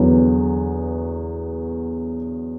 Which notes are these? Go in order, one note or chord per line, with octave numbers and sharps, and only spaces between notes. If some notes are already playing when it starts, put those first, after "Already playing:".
Already playing: E2 D3 F#3 B3